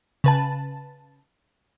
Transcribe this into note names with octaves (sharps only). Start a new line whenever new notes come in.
C#3 B4 A5